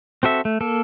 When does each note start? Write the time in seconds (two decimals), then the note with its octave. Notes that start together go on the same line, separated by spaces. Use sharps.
0.23 C4 F#4 A4 E5
0.45 A3
0.61 A#3 A4